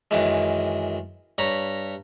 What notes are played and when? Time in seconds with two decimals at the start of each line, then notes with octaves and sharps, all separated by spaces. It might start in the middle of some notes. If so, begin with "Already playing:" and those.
0.11 F#2 D#3 E3 G#3
1.38 G2 C#5 A#5 B5